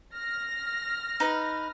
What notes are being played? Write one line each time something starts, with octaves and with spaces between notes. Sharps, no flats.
F6 A#6
D#4 B4